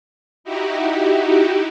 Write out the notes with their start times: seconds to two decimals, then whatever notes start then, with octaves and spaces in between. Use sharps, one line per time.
0.44 D#4 E4 F#4 G4